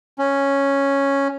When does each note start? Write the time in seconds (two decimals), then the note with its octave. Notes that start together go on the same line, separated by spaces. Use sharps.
0.19 C#4